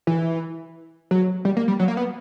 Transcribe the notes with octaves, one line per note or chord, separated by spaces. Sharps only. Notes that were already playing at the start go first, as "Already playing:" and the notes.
E3
F#3
G3
A#3
G3
F#3
A#3
B3